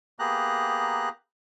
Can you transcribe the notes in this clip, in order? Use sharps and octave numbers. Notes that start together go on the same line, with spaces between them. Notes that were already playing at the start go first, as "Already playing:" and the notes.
A#3 B3 G4 G#4 A#5 F#6